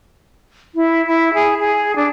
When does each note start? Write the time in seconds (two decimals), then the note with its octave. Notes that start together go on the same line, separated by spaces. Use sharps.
0.75 E4
1.07 E4
1.34 G#4
1.59 G#4
1.96 D4